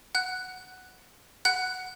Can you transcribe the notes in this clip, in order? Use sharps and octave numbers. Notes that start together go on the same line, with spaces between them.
F#5 F#6
F#5 F#6